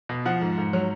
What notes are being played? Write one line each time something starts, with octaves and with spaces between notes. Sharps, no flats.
B2
F3 F#5
G#2
G#2
F#3